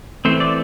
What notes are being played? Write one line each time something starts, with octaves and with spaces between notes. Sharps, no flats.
E3 A3 C4 C5
D5